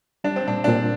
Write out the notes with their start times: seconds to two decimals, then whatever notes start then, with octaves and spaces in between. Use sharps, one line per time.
0.24 G3 D4
0.36 C4
0.47 A#2 D4
0.64 D4
0.68 A#2 C4